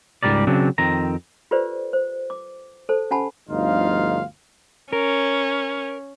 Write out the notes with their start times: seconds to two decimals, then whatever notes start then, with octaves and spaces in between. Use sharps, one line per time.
0.23 C#2 G#2 C3 G3 A#4 D5
0.47 C#3 F#3 C4 D4
0.78 F2 D#3 C4 A#5
1.51 F4 G4 A4 B4 C5 D5
1.93 C5
2.30 D6
2.89 A4 C5 A5
3.11 C#4 G4 F#5 G#5 A5 B5
3.49 G1 D2 F3 D#4 F4 F5
4.93 C#4 A#4